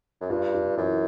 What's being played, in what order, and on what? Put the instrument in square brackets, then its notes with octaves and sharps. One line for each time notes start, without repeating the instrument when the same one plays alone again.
[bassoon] F#2
[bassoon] G2 [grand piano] F4
[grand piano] F4
[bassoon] F#2 [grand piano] E3